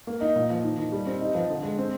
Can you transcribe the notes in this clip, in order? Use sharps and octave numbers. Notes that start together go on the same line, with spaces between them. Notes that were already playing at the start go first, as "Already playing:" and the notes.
A#3
D#4
A#2
F3
D#3
D#3
G3
C4
D#4
F3
D3
G#3
C4